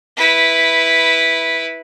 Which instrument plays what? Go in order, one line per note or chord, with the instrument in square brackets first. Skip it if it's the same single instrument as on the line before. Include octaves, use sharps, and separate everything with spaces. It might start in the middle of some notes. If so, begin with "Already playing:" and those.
[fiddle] E4 B4